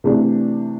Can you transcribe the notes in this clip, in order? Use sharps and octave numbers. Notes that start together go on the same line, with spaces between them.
C3 E3 A3 D4